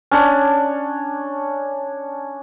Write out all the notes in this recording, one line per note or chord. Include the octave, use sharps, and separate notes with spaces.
C#4 D4 C#5